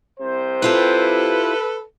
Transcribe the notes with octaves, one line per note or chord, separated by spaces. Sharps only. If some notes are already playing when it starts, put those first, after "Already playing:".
C2 C3 C5
E4 F4 G4 A4 B4